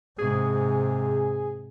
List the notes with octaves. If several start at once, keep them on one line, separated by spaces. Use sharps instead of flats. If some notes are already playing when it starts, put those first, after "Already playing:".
G#2 C3 G#4